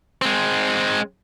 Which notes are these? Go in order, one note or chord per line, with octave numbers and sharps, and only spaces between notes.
G#3 C4